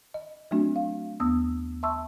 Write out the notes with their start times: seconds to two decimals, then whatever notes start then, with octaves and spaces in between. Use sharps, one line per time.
0.14 D#5
0.51 F#3 A3 C4 D4 F#4
0.76 F5
1.20 D#2 B3 D#6 E6
1.83 E5 A5 C6 C#6 E6